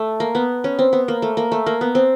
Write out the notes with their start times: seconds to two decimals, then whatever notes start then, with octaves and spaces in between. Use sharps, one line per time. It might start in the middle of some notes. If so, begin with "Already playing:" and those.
Already playing: A3
0.20 A#3
0.35 B3
0.64 C#4
0.79 C4
0.93 B3
1.08 A#3
1.22 A3
1.37 A#3
1.52 A3
1.66 A#3
1.81 B3
1.95 C4